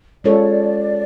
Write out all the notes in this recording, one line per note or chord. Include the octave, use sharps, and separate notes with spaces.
G#3 C#4 F4 A4 C#5 D5